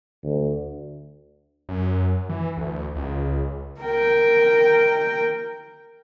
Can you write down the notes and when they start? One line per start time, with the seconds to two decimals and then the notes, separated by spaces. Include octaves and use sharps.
0.24 D2
1.69 F#2
2.29 E3
2.57 D2
2.96 C#2
3.80 A#4 G5